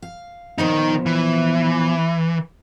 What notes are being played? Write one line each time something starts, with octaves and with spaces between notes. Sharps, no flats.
F5
A#2 D#3 F3 B3 D#4
E3